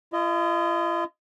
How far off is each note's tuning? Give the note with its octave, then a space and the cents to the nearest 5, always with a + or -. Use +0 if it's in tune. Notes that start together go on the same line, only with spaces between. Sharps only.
F4 -45 D#5 +0